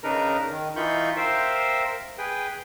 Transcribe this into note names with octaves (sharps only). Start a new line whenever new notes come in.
C#3 D4 D#4 A#4 B4 A#5
D#3
E3 D#4 F4 B5 C#6 G6
A#4 C5 E5 F5 G5
G#4 B4 G5